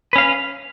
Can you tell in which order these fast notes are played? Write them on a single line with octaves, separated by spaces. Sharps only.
B4 C#4 F5